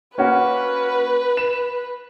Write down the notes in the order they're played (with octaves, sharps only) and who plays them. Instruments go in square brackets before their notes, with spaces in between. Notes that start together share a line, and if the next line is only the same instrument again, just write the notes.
[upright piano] A#3 C#4 F#4 [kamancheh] B4
[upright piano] E7